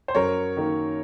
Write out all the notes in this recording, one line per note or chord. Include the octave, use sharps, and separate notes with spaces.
C5
F#2 A#4 C#5
D#3 A#3